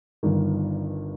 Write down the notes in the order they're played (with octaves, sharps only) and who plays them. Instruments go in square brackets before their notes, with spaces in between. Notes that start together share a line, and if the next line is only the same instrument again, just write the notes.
[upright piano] G1 G2 D#3